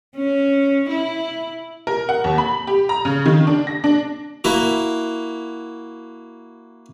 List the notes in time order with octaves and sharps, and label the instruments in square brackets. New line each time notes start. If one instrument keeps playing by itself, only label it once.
[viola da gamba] C#4
E4
[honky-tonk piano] A#4
F#5
D#2
B5
G4
A#5
C#3
D#3
D4
A#6
D4
[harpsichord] A#3 E4 F#4